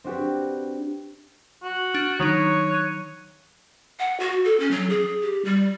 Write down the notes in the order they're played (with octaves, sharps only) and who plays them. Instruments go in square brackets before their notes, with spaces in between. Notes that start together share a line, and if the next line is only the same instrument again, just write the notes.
[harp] C4 D4 F#4 G4 B4
[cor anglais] F#4
[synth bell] D4 F6
[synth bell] D#3 F#3 D#4 [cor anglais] C#5
[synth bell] F#6 D#7
[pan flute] F#5
F#4
A4
C#4
F#3
G#4
G4
G3